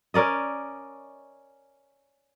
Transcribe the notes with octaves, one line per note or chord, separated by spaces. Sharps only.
C#4 A#4 D5 D#5